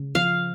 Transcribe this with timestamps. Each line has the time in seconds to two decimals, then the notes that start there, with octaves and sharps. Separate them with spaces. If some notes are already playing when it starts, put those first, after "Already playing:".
Already playing: C#3
0.15 F3 F5